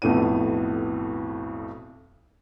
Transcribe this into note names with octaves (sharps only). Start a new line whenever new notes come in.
B1 F2 A2 B3 D#7